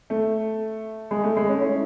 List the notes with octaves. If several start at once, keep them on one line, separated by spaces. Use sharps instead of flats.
A3
G#3
A3
G#3
A3 C#4
C#4 E4